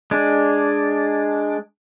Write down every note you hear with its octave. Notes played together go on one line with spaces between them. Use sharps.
G#3 D4